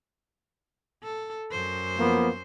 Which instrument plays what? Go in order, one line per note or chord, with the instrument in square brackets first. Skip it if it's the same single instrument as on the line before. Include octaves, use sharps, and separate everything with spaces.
[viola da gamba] A4
F#2 C5
[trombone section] F3 A#3 B3